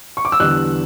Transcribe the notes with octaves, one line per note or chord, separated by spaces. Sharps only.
C#6
D6
E6
E2 D3 G3 F#6